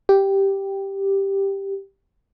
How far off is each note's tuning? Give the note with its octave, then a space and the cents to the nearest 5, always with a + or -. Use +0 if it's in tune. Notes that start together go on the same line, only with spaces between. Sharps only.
G4 +0